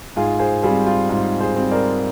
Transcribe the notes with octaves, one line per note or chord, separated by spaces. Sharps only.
G#2 F4 G#4
G#4 C5
G3 C4 F4 G#4
F4
G#2 F4
G#4 C5
G3 C4
A#4 D5